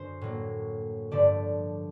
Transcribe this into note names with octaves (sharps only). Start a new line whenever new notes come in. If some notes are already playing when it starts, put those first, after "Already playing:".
Already playing: F#2 D3 C5
A2 F#3 A#3
G2 D3 F3 A3 D5